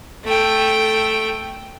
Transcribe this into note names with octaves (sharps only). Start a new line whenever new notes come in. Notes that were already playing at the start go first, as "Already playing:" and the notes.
A3 G5